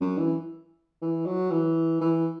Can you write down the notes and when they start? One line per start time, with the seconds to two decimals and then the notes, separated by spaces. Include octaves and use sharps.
0.01 F#2
0.18 E3
1.02 E3
1.26 F#3
1.51 E3
2.01 E3